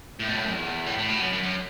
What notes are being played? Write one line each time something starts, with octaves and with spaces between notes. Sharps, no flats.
A2
B2
A2
F#2
E2
A2
A2
B2
F#2
F#2
F#2